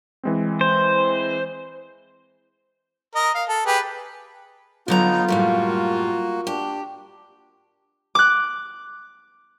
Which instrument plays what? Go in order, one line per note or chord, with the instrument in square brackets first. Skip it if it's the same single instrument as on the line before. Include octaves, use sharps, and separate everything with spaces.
[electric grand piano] E3 G#3 C4
[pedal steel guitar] C5
[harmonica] A#4 D#5
F5
A4
G4 G#4 B4
[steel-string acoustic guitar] D3 F#3 A#5 [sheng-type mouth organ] B3 D#4 [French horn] F4
[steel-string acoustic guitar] F#2 A2 G3 [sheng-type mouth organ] A#3 F#4
[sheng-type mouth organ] D4 [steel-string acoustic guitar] G4
[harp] D6 F#6